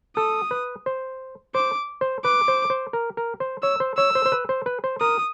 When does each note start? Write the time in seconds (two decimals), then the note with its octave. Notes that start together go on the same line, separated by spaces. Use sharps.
0.17 A4 D#6
0.51 B4
0.86 C5
1.55 C5 D6
2.01 C5
2.24 B4 D6
2.48 C5
2.70 C5
2.93 A#4
3.17 A#4
3.40 C5
3.63 C#5 E6
3.80 C5
3.97 C#5 E6
4.15 C5
4.26 C5
4.32 B4
4.49 C5
4.66 B4
4.84 C5
5.01 A#4 D#6